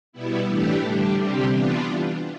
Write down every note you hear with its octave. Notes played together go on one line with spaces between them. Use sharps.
B2 G3 B3 E4
A2 E3 A3 D4 G4
D3 G3 D4
C3 G3 C4 G4
E3 B3 D4 F4